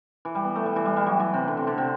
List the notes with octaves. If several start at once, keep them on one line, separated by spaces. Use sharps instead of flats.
E3
G3
B3
A3
G3
E3
G3
G3
F#3
E3
C3
D3
C3
D3
C3